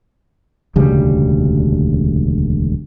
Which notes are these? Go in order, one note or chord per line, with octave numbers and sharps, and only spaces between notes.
E1 D2 C#3 G3